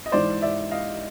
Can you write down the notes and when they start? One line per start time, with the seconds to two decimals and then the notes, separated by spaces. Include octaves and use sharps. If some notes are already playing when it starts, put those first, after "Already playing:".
0.06 D#5
0.12 G#2 E3 G#3 C5 D5
0.42 D5 E5
0.71 D#5 F5